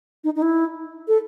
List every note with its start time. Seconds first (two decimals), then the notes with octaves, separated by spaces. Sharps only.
0.24 D#4
0.36 D#4
0.42 E4
1.08 A4